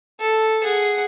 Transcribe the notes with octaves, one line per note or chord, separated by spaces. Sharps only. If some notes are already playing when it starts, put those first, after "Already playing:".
A4
G#4 F#5